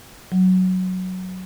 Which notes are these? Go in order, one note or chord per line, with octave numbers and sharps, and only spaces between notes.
F#3